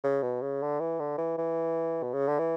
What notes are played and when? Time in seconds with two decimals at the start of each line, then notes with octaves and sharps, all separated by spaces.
0.04 C#3
0.23 B2
0.42 C#3
0.62 D3
0.80 E3
1.00 D3
1.18 E3
1.38 E3
2.03 B2
2.13 C#3
2.28 D3
2.39 E3